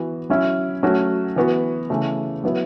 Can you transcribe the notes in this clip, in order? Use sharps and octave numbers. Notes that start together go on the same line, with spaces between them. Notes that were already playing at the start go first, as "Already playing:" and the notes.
Already playing: E3 B3 F#4
F#3 C#4 E4
F#3 A3 C#4 F#4
E3 B3 F#4
C#3 E3 A3
F#3 B3 E4